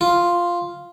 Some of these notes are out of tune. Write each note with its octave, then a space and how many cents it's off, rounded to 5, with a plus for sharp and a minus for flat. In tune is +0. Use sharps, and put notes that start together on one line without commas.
F4 +0